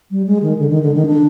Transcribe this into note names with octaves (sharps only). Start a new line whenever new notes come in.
G3
G#3
D#3
D3
D#3
D3
D#3
D4